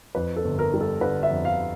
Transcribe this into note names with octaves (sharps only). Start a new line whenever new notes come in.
F2 B4
A4
G1
A#4
G3
A4
D3 B4
E5
F2
F5